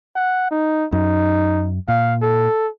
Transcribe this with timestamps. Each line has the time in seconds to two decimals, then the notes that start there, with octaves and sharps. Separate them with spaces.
0.15 F#5
0.51 D#4
0.92 F#2 D#4
1.88 A#2 F5
2.22 A4